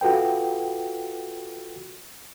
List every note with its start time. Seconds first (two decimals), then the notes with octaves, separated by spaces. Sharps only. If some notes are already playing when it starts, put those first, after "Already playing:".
0.01 F4 F#4 A4 B4 G5